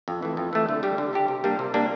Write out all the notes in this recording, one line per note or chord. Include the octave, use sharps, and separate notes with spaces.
F2
E3 A3
F2
E3 A3
D3
G3 D4 G4
D3
G3 D4 G4
C3
G3 A#3 D4
C3
G3 A#3 D4